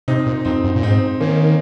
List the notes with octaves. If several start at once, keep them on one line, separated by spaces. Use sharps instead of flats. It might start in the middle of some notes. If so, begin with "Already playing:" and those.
C3 C4 D#4
A#2
F2 C4 D#4
F#2
A#2
G#2 C4 D#4
D#3 A#3 C#4